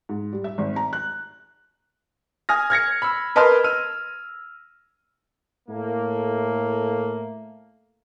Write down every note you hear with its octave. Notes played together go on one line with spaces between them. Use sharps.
G#2
G3
E5
G#1
A#5
F#6
G#5 D#6 F6 A#6
F6 G#6 A#6 C#7
B5 E6
A#4 B4 D#5 A5 C6 F6
E6 F6 D#7
A2 A3 A#3